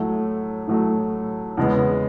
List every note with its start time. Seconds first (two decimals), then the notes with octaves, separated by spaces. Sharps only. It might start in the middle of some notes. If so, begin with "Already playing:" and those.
Already playing: A2 F#3 A3
0.67 A2 F#3 A3
1.57 E2 C#3 G#3 B3